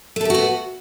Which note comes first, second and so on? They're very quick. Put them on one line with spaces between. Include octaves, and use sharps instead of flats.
A3 A4 G4 F#4 B3